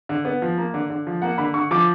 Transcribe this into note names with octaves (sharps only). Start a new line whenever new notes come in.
D3
B3
F3
A#3
D3
D3
F3
A#3 F#5
D3 B5
D3 C#6
F3 D6